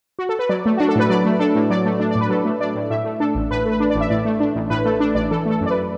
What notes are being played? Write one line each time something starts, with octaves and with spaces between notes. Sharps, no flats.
F#4
A4
B4
F#3 D5
A3
D4 F#4
A4
A2 B4
F#3 D5
A3
D4 A4
A2
F#3 D5
A3
D4
D5
A2
B4
F#3 A4
A3
D4 D5
A2
A2 E5
A3
D4 A4
A1
A2 B4
A3
B4
D4
D5
A1
E5
A2 D5
A3
D4
A1
A2 B4
A3 A4
D4
A1 D5
E3 A4
A3 A4
F#2
D5
B4